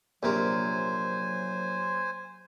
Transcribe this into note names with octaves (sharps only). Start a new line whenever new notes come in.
A#1 C3 F#3 A#4 C5 G#5